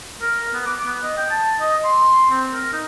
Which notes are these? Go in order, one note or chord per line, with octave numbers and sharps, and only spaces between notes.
A#4
B3
D6
B3
D#5
G5
A5
D#5
C6
C4
A#4
D#4